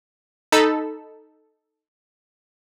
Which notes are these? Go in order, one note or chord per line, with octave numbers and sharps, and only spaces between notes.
D#4 A4 B5 E6